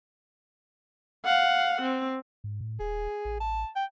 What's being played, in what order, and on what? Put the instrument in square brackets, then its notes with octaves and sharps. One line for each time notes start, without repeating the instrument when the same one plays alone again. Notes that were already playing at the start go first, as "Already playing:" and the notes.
[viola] F5 F#5
C4
[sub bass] G#2
A2
[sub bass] D#1 [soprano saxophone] G#4
[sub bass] A1
[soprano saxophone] A5
G5